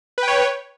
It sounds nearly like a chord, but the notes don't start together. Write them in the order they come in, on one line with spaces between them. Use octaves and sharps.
B4 G5 C#5